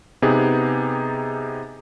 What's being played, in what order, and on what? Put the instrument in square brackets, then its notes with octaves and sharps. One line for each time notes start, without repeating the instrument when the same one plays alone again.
[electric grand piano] C3 B3 D#4 G4 G#4